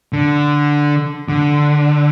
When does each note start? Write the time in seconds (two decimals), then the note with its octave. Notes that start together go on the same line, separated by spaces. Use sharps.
0.13 D3
1.29 D3